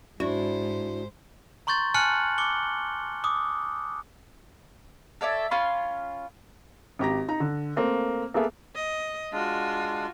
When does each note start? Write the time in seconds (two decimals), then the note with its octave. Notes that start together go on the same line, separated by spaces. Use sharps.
0.20 G#2 D4 E4 F#4 C5
1.67 A#5 C6 C#6 G6 A6
1.94 G#5 A5 F6 F#6 C#7 F#7
2.38 D6 C#7 G7
3.24 D6 D#6
5.21 A4 C#5 D5 E5
5.51 C#4 F4 B5 C6
6.99 G#1 G4 A#5 A#6
7.28 D#4 A#5
7.40 D3
7.76 A3 A#3 C4
8.34 A#3 B3 G#4 A4 E5
8.75 D#5
9.32 G#3 D4 F4 F#4